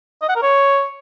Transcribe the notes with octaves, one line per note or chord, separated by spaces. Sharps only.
D#5
F#5
A#4
C#5